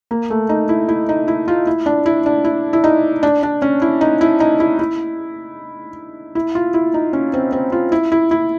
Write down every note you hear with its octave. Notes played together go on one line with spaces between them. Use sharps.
A#3
A3
D#4
E4
E4
D#4
E4
F4
E4
D4
E4
D4
E4
E4
D#4
D4
D4
C#4
E4
D#4
E4
D#4
E4
E4
E4
F4
E4
D#4
C#4
C4
C4
F4
E4
E4
E4